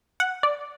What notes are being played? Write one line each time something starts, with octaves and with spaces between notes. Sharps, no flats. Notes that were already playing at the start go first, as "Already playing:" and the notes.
F#5
D5